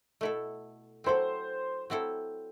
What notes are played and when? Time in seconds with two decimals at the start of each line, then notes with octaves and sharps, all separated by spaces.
0.21 B2 A3 E4 A4
1.04 F#3 C4 E4 A4 C5
1.90 F#3 C4 E4 A4